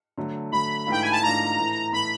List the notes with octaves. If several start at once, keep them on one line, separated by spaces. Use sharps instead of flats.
D3 F#3 A3
D3 F#3 A3 B5
G#2 E3 A3 D4 F4 G5
G#5
A5
G#2 E3 A3 D4 F4 A#5
A2 E3 A3
A2 E3 A3 B5